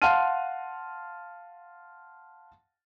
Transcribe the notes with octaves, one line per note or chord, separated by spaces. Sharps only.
F5 F#5 A5 C6 F6 D#7